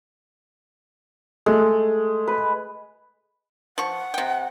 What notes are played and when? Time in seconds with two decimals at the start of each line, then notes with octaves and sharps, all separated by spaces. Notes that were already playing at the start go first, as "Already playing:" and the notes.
1.46 G#3 A3
2.27 B4
3.78 F3 F#5 C#6
4.14 C3 G5